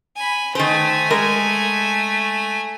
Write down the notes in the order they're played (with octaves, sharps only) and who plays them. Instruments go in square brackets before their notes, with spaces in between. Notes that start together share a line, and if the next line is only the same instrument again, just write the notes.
[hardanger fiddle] G#5 B5
[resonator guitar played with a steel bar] D#3 C5 [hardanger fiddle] A3 G#5
[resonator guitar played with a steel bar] G#3 A#4